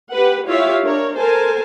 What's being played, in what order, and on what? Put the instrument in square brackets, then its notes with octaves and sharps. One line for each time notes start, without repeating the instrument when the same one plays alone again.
[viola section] G4 B4 F#5
E4 F4 G4 C#5 E5 F5
D4 A#4 C#5
A4 A#4 C5 G#5 A5